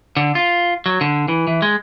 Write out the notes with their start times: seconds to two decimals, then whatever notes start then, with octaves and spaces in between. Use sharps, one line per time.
0.17 D3
0.35 F4
0.86 F#3
1.01 D3
1.28 E3
1.47 E3
1.62 G#3